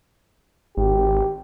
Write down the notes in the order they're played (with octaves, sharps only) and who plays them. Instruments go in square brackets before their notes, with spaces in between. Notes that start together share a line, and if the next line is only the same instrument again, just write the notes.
[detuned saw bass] G#1 [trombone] G4